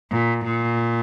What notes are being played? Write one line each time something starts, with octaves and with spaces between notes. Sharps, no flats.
A#2
A#2